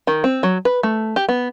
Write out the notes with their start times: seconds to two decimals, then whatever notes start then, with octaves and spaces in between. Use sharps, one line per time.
0.07 D#3
0.24 C4
0.43 F#3
0.65 B4
0.83 A3
1.16 G4
1.29 B3